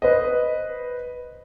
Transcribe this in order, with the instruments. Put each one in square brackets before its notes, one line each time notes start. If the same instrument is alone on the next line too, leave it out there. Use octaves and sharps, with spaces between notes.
[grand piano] B4 C5 D#5